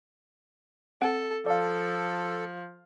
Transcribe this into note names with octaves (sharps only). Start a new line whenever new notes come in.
C4 A4 F#5 D7
F3 A4 D5 F5